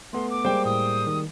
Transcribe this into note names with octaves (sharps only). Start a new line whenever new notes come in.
A3 B3 A4 C6
D6
G3 G#3 A#3 C5 G5
A2 D#6
D#3